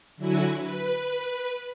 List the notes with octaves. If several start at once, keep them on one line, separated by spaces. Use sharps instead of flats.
D3 F#3 E4 F#4 G#5 E6
B4